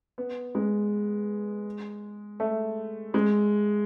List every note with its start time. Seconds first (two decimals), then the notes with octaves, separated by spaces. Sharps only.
0.18 B3
0.55 G#3
2.40 A3
3.14 G#3